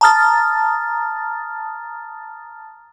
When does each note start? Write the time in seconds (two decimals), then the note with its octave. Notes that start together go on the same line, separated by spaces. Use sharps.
0.01 A5 A#5 D#6 F6 A6